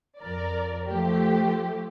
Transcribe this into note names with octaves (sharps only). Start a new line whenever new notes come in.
F2 A#4 D5
F3 A3 G4